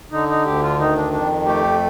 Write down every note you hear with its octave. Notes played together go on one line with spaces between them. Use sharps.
D3 D#4
D#4
D2 G4
F4
D#3 D#4
D4
F2 D4
A3 G4